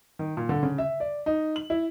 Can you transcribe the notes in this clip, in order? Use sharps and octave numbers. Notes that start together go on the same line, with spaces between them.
D#3
A#2
D3
C#3
E5
D5
D#4
F#7
E4